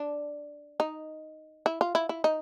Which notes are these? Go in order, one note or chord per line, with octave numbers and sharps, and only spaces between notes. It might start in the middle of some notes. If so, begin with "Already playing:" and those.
Already playing: D4
D#4
E4
F4
E4
E4
D#4